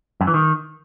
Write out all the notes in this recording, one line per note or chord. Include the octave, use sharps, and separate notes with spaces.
F#2
E3
D#3